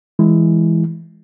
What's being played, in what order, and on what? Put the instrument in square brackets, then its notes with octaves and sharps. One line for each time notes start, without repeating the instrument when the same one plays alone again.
[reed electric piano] E3 G#3 E4